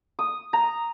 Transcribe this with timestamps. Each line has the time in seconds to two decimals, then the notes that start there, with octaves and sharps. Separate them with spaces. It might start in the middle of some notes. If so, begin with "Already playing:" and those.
0.19 D#6
0.53 A#5